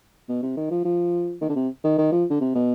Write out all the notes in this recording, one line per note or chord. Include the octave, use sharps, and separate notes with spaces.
B2
C3
D#3
F3
F3
D#3
D3
C3
D#3
D#3
F3
D3
C3
B2